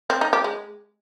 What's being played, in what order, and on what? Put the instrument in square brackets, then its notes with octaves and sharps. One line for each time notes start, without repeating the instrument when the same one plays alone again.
[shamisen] C4
D#4
G4
G#3